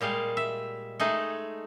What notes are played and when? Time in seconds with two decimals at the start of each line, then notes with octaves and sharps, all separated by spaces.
0.01 A#2 G3 G#3 F5
0.37 E5
1.00 G#3 A3 D#4 G#4